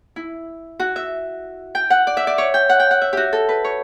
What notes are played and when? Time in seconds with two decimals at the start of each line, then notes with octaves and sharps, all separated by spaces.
0.16 E4
0.80 F#4
0.96 E5
1.75 G5
1.90 F#5
2.07 D5
2.17 E5
2.27 D5
2.38 C#5
2.54 G5
2.69 F#5
2.80 G5
2.91 F#5
3.01 E5
3.13 F#4 G4
3.33 A4
3.49 B4
3.64 C#5